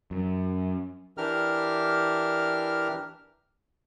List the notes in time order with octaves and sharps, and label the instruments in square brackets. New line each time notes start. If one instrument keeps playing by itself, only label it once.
[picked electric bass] F#2
[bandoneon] E3 D4 G4 A#4 F6